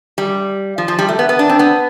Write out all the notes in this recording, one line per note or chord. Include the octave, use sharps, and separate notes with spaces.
G3
F3
F3
G3
A3
B3
B3
D4
C4
B3